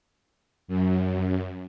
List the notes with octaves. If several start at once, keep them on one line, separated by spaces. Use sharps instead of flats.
F#2